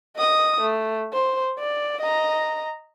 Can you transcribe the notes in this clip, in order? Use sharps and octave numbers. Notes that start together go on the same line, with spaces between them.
D#5 D#6
A3
C5
D5
D#5 A#5